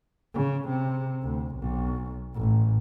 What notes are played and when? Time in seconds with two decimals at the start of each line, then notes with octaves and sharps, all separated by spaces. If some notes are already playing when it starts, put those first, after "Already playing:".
0.34 C#3
0.68 C3
1.22 D2
1.56 B1
2.35 A1